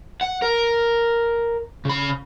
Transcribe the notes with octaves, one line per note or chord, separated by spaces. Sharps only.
F#5
A#4
C#3 B5